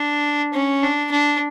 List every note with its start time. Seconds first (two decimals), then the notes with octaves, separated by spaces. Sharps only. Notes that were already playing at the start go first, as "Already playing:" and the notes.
Already playing: D4
0.54 C#4
0.83 D4
1.12 D4